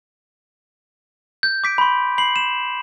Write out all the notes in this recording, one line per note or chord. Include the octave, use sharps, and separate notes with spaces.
G6
D6 B6 D7
B5 C6
B5 C7 F#7
E7